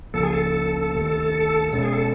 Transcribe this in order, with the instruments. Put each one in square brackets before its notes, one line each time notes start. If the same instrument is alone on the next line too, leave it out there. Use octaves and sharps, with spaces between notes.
[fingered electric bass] C#2 C#3 F3 A#3 [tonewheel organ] A4
[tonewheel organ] G#4
A4
[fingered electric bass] D2 C3 D#3
[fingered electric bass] B2 G#3 C#4 [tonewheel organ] A4
[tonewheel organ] G#4
A4